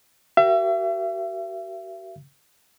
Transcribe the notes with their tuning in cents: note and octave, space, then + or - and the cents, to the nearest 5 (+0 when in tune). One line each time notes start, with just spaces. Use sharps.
F#4 +45 A#4 +0 E5 +40